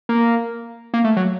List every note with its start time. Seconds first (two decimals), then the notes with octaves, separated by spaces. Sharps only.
0.09 A#3
0.94 A#3
1.04 A3
1.17 F#3